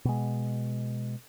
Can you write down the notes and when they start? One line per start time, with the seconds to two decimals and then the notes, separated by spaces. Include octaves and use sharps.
0.05 B2 G#3